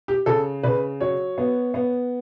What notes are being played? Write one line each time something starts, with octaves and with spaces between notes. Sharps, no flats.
G4
C#3 A4
C#3 B4
F#3 C#5
B3
B3